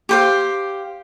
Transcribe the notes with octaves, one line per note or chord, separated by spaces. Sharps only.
G4 C5 F5